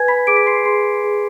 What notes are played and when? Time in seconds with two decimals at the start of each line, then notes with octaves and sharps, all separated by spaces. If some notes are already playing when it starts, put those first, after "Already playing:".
Already playing: B4 G#5 G#6
0.08 B5 B6
0.27 G#4 D6 D7
0.37 B6
0.46 C6 C7
0.65 G#4 C6 C7
1.04 G#4